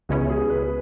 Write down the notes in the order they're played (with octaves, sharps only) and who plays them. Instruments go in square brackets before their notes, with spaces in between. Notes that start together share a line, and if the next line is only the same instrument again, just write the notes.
[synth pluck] C#2 C#3 G#3 C#4 E4 [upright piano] B3
[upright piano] G#4
B4